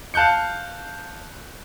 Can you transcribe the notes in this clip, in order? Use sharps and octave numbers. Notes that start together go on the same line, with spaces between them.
F5 A5 F#6 G6 C#7